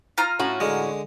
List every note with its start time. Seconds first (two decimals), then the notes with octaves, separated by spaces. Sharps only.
0.18 F4 A#5 F6
0.39 A2 C#4 F#4
0.60 D3 G#3